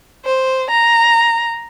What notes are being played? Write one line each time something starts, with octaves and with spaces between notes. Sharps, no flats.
C5
A#5